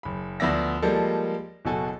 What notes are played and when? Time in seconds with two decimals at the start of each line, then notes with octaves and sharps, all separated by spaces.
0.03 F#1 B5
0.40 D2 F3 B3 D5 E5 A#6
0.82 F3 G3 G#3 A#3 A4
1.65 F#1 B2 F#4 A4 G#5